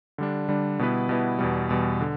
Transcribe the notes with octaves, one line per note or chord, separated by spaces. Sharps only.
D3 G3 D4
D3 G3 D4
B2 G3 B3 E4 B4
B2 G3 B3 E4 B4
E2 B2 G3
E2 B2 G3
D3